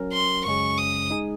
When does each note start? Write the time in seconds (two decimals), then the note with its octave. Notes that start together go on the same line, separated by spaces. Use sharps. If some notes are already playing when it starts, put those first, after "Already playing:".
Already playing: F#3 C#4 F#4 A#4
0.13 C6
0.45 F#2 C#3 G#3 C#4 G#4 C#6
0.78 D#6
1.10 G#3 D#4 G#4